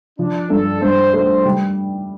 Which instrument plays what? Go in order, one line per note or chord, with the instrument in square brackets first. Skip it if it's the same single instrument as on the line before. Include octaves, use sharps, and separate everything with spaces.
[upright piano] F3 [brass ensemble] D4
[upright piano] G2 [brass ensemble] A4
[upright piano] G2 [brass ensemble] C5
[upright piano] A3 [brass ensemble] C5
[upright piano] G3